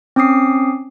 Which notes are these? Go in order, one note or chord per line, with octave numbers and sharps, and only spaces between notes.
C4 C#4 D6 D#6 C7